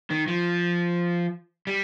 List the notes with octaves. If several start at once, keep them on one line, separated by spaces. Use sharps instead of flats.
D#3
F3
G3